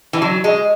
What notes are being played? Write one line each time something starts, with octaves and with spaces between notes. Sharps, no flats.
E3
F#3
G#3